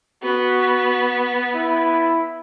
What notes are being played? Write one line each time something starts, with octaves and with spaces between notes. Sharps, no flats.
B3 F#4
E4